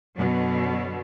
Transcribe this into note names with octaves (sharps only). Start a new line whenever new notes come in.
F#2 B2 D3 F#3